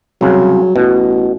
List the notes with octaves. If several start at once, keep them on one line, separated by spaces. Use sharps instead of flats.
C2 C#3 F#3
A1 B2